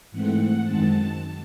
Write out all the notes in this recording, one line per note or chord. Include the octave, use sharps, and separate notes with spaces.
G#2 E3 A3 C4 F#5
F#2 D#3 G#3 C4 A5